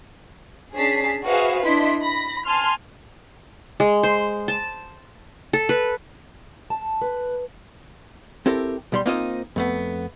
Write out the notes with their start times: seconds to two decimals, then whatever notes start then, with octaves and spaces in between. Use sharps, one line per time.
0.74 C#4 D4 G#4 A5 B6 C7
1.25 F#4 G#4 B4 C5 E5 F5
1.65 D4 E4 D#5 C6 B6
2.00 B5 A#6
2.45 G#5 A5 C6 F6
3.80 G#3
4.03 C5
4.48 A5
5.53 A4
5.69 B4
6.70 A5
7.02 B4
8.46 C4 E4 G4 A4 A#4
8.92 B1 G3 C6
9.06 A#3 C4 D#4 F4 C5 D#5
9.56 F2 A3 B3